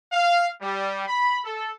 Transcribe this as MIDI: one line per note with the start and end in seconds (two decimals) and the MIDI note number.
0.11 0.47 77
0.61 1.02 55
1.06 1.38 83
1.44 1.69 69